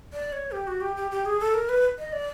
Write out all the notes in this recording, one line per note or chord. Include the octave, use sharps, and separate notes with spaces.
D5
C#5
G4
F#4
G4
G4
G4
G#4
A4
A#4
B4
D#5
D5